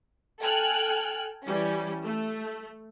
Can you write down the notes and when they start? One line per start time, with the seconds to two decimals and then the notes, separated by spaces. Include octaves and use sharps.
0.41 A4 G5 G#5 F6 F#6
1.47 E3 G3 C#4
2.03 A3